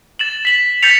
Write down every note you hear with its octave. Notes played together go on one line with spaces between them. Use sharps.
A6 E7 F#7
B6 F#7
G6 A6 B6 C#7 F7